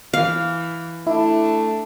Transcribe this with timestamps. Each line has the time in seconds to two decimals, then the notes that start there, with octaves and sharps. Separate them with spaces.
0.14 E3 F5
1.07 A3 D4 E4